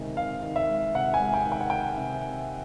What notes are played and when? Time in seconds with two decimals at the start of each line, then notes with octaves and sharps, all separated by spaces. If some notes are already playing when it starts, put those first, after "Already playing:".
Already playing: C3 D#3 G#3
0.17 C3 F5
0.43 D#3
0.56 E5
0.69 G#3
0.95 C3 F#5
1.14 G#5
1.20 G#3
1.34 G5
1.45 D#3
1.52 G5
1.61 F#5
1.70 D#3 G5
1.97 C3